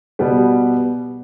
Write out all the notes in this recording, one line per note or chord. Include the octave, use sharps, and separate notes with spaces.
B2 G3 B3